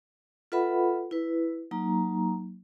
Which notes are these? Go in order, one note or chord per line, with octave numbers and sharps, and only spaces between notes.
F4 A4 B4 E5 F#5 B5
E4 B4
F#3 A#3 D#4 A#5